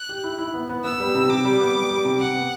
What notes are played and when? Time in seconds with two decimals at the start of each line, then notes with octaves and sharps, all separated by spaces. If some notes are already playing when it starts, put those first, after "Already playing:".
Already playing: F#6
0.09 G4
0.24 E4
0.39 E4
0.54 B3
0.69 B3
0.84 B3 E6
1.00 G3
1.15 C3
1.29 C3 D6
1.44 G3
1.60 B3
1.75 G3
1.90 G3
2.05 C3
2.20 C3 F#5
2.35 B3